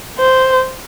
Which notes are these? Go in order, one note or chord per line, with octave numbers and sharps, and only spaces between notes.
C5